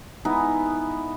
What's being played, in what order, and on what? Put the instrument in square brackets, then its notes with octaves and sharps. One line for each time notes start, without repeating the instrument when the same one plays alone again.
[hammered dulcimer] G#3 B3 D#4 E4